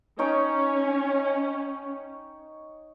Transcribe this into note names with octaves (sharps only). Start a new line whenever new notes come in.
C#4 D#4 C#5 G5